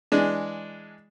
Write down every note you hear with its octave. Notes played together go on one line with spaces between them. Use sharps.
E3 G#3 D4